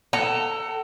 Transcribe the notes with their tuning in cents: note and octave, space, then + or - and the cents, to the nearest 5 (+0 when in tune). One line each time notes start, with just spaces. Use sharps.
A4 +15 F#5 +45 A#5 -15